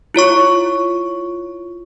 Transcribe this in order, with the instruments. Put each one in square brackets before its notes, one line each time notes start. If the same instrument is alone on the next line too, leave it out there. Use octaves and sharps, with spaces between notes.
[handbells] E4 F4 C#5 C#6